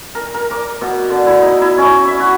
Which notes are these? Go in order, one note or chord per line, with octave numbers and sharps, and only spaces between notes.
A#4
A#4
D6
B2
D3
E4
D#4
E4
C#4
E5
F#4